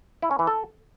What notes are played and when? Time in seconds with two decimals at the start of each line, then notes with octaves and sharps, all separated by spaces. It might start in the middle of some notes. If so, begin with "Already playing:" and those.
0.22 E4
0.31 C#4
0.39 E3
0.47 A4